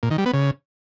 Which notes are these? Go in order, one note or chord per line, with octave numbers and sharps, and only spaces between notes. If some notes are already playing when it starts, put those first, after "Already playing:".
A#2
D#3
G3
B3
C#3